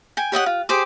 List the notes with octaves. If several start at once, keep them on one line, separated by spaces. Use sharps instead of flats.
G5 G#5
G4 C#5 D#5 F#5
F4
G4 G#4 C5 D6